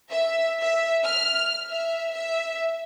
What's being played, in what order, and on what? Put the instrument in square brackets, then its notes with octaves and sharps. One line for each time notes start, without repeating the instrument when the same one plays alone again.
[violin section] E5
E5
F6
E5
E5